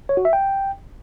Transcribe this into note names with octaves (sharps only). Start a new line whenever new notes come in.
C#5
F#4
E5
G5